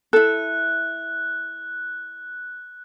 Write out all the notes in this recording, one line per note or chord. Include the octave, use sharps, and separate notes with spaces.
E4 A4 F#6